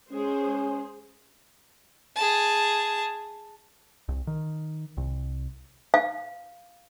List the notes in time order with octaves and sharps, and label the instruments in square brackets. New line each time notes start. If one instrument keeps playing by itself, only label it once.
[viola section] G#3 G#4 C5 [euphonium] C#4
[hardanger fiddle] G#4 A5
[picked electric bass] C2
D#3
C2
[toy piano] F5